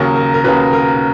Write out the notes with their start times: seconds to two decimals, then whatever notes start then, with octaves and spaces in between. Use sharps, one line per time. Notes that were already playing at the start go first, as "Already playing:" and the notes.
Already playing: D#2 C#3 F#3 A#4
0.16 A#4
0.34 A#4
0.44 D#2 C#3 F#3 B4
0.73 A#4